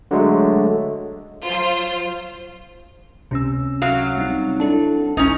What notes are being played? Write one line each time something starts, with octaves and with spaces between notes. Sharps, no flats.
D3 F#3 G#3 A3
F#3 F4 C5
C#2 C3 C#4 E6
F#3 F5
G3 C4 D#4
D4 E4 A4 A5
G#1 C#2 C#4 D#4